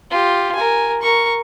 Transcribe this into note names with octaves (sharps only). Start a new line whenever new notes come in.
F4 G4
A#4 G#5
A#4 C#6